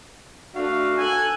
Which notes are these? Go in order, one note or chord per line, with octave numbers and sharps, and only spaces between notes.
A3 D4 F#4 F5
A4 G#5 F#6